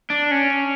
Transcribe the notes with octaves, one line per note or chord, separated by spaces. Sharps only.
D4
C#4